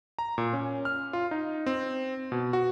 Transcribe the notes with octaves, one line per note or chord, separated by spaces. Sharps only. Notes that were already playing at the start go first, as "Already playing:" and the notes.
A#5
A#2
C#4
F6
F4
D#4
C4
B2
F#4